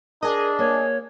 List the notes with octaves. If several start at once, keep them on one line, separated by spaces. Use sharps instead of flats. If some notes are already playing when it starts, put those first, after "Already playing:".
D4 G#4 A#4 D#5
A#3 C#5